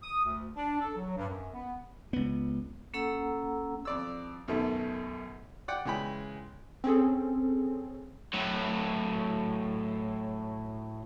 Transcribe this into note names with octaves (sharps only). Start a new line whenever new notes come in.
D#6
D2
D4
A4
F#3
G2
F#2
B3
C#2 B3
A#3 C#4 A4 F#5 A#5 E6
F2 D5 E6
B1 F#2 B2 D#3 A3
D5 F#5 G5
C#3 E3 G#3 G5 B5
C4 C#4 G#4 A4
A2 F#3